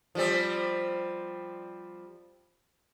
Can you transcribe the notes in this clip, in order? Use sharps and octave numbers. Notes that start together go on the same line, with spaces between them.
F3 G3 C4